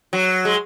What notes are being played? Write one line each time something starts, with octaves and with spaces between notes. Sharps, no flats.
F#3
G#3